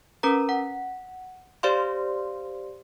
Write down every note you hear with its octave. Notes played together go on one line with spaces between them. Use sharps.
C#4 A#4 B4 A#5
F#5
G4 C5 D5 F5 C6